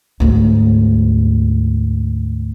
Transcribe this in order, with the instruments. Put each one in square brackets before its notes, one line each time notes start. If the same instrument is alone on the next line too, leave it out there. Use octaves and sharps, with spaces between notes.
[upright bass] D2 G#2